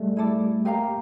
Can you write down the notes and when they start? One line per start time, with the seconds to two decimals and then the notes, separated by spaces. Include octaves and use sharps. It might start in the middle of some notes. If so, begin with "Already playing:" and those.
Already playing: G3 A3
0.16 E4 A4 D5
0.65 A#3 G4 A#4 F5 A#5